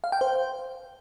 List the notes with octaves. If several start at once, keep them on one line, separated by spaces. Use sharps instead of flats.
F5
G5
C5